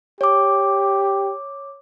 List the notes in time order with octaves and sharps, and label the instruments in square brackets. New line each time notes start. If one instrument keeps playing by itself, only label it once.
[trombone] G4 [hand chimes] C#5 D6